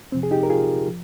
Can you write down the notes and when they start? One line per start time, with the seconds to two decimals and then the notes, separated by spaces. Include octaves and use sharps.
0.12 F2 C3 F3 C4
0.23 G#4
0.31 D#4 G4
0.43 A#4
0.50 F4 G#4
0.88 F3